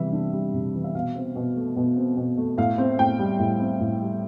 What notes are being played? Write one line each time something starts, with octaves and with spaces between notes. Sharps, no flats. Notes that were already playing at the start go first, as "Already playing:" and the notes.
Already playing: C3 E3 G3 E5
D4
G3
C3
E3
E5
B2 F5
C4
B2
A3
B2
C4
B2
A3
A2 F5
C4
A2 G5
G3
A2
C4
A2
G3